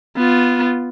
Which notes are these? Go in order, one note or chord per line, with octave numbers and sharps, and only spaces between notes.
B3 F4